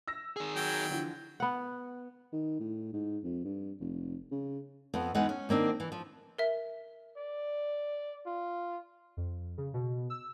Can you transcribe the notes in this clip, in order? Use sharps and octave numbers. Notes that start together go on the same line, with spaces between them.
E6 A#6
D#3 G#4
F#3 G5
D3 E3 F3
B3 F#5
D#3
A2
G#2
F2
G2
F1
C#3
F2 B3
E2 G#3 B3 D#4 F#5
C#4
D#3 A#3 C4 D4
E3
F3
A#4 E5
D5
F4
F2
C#3
B2
E6